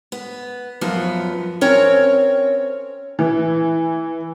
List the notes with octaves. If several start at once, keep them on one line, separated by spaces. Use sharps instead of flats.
B3
F#2 F3 B3
C4 C#4 A#4 C#5
E3